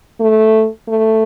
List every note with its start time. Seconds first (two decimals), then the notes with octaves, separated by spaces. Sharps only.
0.20 A3
0.88 A3